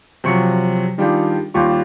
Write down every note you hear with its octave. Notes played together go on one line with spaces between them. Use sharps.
C3 F3 F#3 C#6 C#7
D#3 G3 D4 F4 G4 G#4
D#2 G3 F4 G4 C#6